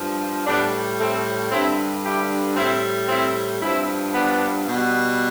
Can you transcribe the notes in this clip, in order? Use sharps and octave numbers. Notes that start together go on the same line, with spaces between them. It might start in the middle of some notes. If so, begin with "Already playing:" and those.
Already playing: G2 F3
A2 G3 B3 D4
A3 C4
G2 D3 G3 C4 E4
E4 G4
A2 G3 C4 E4
C4 E4
G2 F3 C4 E4
B3 D4
B2
G3